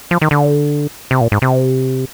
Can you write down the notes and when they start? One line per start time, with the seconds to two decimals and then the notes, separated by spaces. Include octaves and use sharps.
0.11 F3
0.22 D#3
0.31 D3
1.11 C3
1.21 A#2
1.32 G#2
1.42 C3